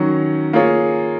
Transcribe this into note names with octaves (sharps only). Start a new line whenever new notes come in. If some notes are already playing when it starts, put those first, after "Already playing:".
Already playing: D#3 F#3 C#4
A#3 F4 G#4 C#5